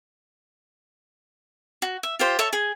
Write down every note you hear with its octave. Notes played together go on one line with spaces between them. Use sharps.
F#4
E5
F4 G4 C5
A4 C#5 E5 A5
G#4 G#5